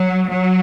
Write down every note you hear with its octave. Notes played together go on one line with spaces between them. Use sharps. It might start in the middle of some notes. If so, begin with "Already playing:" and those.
Already playing: F#3
F#3